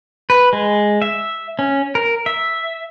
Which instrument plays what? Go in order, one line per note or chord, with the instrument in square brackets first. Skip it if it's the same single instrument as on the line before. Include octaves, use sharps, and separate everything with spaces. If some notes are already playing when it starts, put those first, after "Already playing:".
[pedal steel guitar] B4
G#3
E5
C#4
A#4
E5